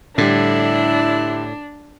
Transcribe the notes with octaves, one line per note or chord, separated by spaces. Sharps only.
A2 D3 G3 D4 E4